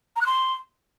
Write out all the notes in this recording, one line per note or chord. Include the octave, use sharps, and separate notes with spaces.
A#5
F#6
C6